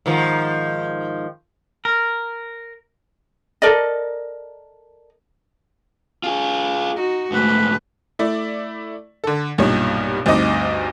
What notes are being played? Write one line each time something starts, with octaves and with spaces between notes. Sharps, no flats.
G#2 D#3 F3
A#4
A4 A#4 D5 D#5
F4 G#4
D#4 F#4
D2 G#2 A3 B4
A3 E4 D5
D3 A4
B1 G2 A#2 G3 D#4 C#5
D2 G2 C4 D#4 D#5 D6